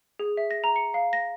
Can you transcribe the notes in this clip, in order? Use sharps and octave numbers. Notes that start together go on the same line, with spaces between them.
G#4
E5
A#6
A#5
C#7
F5
A#6